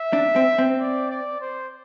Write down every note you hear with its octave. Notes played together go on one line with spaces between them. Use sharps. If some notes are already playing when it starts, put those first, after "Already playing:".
Already playing: E5
D4
C4
C4
D5
D5
C5